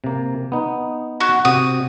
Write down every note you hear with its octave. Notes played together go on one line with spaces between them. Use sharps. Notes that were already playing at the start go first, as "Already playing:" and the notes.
C3 A#3
B3 D#4
F#4
C3 F#4 D#6